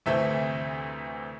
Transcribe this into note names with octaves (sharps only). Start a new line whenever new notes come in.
D2 C3 E3 A3 C4 E5